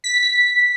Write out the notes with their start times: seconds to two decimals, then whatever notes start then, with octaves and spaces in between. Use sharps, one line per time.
0.04 B6